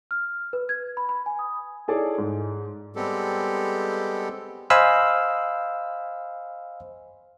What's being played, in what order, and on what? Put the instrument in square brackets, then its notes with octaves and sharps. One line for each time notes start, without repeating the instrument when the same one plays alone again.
[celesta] F6
B4
G#6
B5
B5
G#5
D#6
[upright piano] D#4 E4 G#4 A4 C#5 D5
G#2
[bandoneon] G3 G#3 B3 C4 G4 A4
[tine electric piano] C5 D#5 F5 G#5 B5 E6